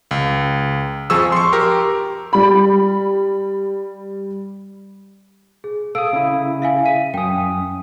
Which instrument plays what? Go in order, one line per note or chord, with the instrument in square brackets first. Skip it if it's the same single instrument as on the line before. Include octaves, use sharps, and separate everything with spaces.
[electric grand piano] C#2
F2 F3 G#4 C#6 E6
C6 C#6
G4 A#4
[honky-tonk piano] G3 B5
[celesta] G#4
[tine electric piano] A4 D#6 [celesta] F5 E6 D7
[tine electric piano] C#3 E4
[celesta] E5 F5 G#5
[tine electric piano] B6 [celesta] D#7
[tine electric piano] F#2 D#6 [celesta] G5 G#5